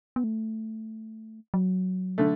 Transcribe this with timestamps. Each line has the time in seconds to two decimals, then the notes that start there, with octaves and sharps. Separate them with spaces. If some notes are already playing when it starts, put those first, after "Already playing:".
0.16 B3
0.24 A3
1.54 F#3
2.18 D3 A3